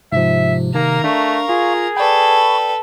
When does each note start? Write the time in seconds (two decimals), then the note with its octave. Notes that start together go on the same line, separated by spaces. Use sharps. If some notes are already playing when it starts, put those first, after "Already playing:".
0.12 G#2 C3 F3 E5
0.75 D#3 A#3 A#4 A#5
1.04 A3 D4 F5 C#6
1.49 F4 G#4
1.97 A4 B4 D5 G5 B5 C#6